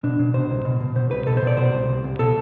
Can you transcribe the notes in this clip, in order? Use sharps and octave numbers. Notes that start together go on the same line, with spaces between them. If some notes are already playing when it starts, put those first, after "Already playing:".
B2 D4
B2
B2 C5
C2
B2
B2
B2 C5
C2 B4
B2 A4
C5
B2 D5
B2 C5
C2
C2
C2
B2 A4